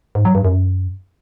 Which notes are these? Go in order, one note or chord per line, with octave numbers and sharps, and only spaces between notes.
G#2
F#3
G2
F#2